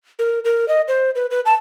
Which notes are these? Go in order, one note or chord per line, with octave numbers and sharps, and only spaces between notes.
A#4
A#4
D#5
C5
B4
B4
A5